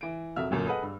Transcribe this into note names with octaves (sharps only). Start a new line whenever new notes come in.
E3 D7
E1 F2 F#4 E5 E6 F6
G1 F#2 A#2 F#3
G#4 A4 B4 D#5 F#5
G2 G3